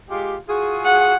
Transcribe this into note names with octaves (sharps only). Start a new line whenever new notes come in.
G#3 F4 G4
F4 F#4 G#4
F#5